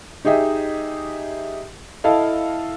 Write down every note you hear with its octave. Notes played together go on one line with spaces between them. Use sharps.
D#4 G4 G#4 D#5 E5
E4 A4 D#5 F5